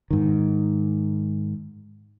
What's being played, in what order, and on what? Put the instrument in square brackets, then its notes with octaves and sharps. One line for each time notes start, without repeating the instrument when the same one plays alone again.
[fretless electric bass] G#2 D#3